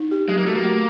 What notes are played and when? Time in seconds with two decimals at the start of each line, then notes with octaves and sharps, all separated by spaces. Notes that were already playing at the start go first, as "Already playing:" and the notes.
Already playing: D#4
0.11 G4
0.28 F#3 G#3
0.37 A#3
0.46 A3 F#4
0.55 A#3
0.64 A3